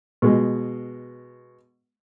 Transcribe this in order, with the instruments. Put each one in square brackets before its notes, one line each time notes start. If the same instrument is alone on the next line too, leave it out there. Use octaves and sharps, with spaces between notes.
[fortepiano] B2 G#3